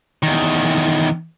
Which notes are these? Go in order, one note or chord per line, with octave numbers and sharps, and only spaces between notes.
E2 D#3